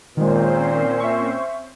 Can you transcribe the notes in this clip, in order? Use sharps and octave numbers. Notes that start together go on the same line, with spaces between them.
A#2 D#3 G#3 C4 C#4 C5
E5 C#6